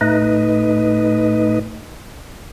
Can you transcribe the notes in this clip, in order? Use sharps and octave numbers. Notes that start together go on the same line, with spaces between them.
A2 A3 D#4 B4 D#5